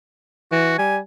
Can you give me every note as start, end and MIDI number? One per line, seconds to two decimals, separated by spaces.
0.52 0.77 52
0.52 0.74 66
0.78 1.00 55
0.78 0.97 80